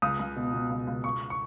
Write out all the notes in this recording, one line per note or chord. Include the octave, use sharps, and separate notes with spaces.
C#2 D#6
C#2
B2
B2
C#2
C#2
C#2 C#6
C#6